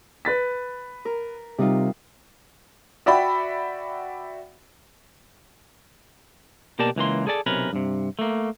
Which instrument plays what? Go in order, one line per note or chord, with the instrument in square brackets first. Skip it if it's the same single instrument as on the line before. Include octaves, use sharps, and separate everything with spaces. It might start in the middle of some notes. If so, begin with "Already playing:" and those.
[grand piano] B4 A6 B6
[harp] A#4
[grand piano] C3 [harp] G3 D#4 F4
[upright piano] F#4 D5 E5 F#5 G5 B5
[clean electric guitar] B2 A#3 G4 A#4 D5 A5
C#2 E3 A#3 C6
G#4 A4 D5 A5
B1 C3 C#4 A#4 B4
G2 C3
A3 A#3